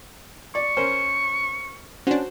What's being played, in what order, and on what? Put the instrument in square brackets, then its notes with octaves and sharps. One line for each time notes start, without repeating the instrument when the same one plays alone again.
[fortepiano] D5 [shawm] C#6
[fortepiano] C#4 A#4 C5
[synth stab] C#4 D4 [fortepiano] F#4 C5